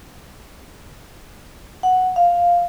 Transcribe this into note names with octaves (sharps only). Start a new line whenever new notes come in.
F#5
F5